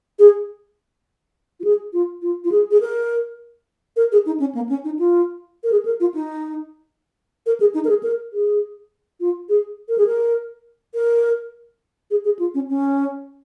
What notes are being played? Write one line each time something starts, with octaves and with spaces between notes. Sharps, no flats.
G#4
F4
G#4
F4
F4
F4
G#4
G#4
A#4
A#4
G#4
D#4
C#4
A#3
C#4
D#4
F4
A#4
G#4
A#4
F4
D#4
A#4
G#4
D#4
A#4
G#4
A#4
G#4
F4
G#4
A#4
G#4
A#4
A#4
G#4
G#4
F4
C#4
C#4